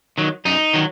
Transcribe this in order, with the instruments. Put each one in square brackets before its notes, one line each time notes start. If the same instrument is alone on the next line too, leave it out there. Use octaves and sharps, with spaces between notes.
[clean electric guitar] D#3 F#3
F#2 D#4
D#3 F#3